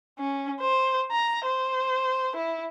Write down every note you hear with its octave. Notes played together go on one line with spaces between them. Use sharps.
C#4
C5
A#5
C5
E4